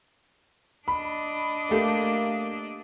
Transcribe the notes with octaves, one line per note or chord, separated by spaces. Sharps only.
D4 D#5 B5
A3 A#3 G4 A4